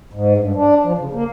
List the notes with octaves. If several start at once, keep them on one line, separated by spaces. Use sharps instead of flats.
G#2
G2
D4
F3
C#3
A#3